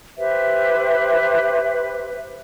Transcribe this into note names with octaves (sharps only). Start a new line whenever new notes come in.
G4 B4 C5 E5